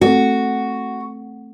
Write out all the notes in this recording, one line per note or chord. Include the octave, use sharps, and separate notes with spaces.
A3 C4 F#4 A4